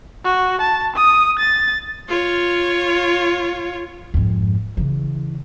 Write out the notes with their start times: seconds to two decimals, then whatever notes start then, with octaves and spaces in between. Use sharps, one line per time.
0.24 F#4
0.61 A5
0.96 D#6
1.39 A6
2.08 F4 C#5
4.14 F2 G#2
4.77 C#3 E3